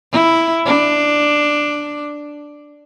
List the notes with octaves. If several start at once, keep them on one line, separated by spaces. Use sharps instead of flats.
E4
D4